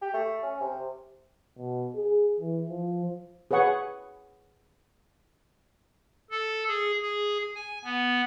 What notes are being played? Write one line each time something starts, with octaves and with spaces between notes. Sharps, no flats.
G4
A3
C#4
C3
B2
G#4
E3
F3
G#4 B4 C#5 F#5 C#6
A4
G#4
G#4
G#5
B3